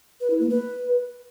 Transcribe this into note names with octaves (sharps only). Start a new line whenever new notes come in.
B4
E4
A#3
B4